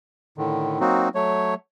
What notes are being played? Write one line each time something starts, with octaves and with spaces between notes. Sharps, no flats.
A2 D3 D#3
F#3 A#3 C4 D#4 F#4
F#3 A3 C#5